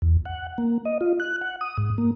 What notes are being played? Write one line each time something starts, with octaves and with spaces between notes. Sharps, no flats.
E2
F#5
A#3
D#5
F4
F#6
F#5
D#6
G#2
A#3